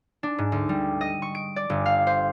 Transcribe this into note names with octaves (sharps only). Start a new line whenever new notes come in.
D4
G#2
D2
G3
D#5
C#6
D7
D5
G1
F5
C5